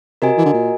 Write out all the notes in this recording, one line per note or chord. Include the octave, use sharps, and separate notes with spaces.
C3 F#4 A#4 D#5 G#5
E3
D3
A#2